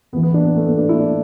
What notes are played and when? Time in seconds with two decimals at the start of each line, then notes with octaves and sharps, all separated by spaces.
0.13 E2 B3
0.16 E3
0.23 B3
0.34 D4
0.45 B3
0.56 A3
0.66 B3
0.78 D4
0.89 E4
1.00 D4